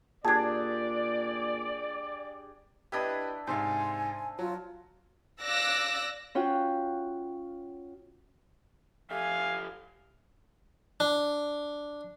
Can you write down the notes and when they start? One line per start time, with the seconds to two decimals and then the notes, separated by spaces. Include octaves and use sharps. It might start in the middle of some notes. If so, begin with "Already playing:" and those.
0.25 A#2 D4 G4 G#4 D5 A5 G#6
2.92 D4 E4 G4 B4 D#5
3.47 G#2 C3 C5 E5 F5 G#5
4.39 F#3 F4
5.41 D5 F5 D6 E6 F#6 A#6
6.35 C#4 F4 F#4 C#5 F#5 G5
9.11 G4 A4 E5 F5 G#5
11.00 D4